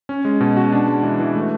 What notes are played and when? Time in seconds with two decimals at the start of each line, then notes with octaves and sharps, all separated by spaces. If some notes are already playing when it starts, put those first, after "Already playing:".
0.09 C#4
0.25 G#3
0.41 B2
0.57 F#4
0.72 D4
0.88 G#3
1.03 E3
1.19 E3
1.35 A3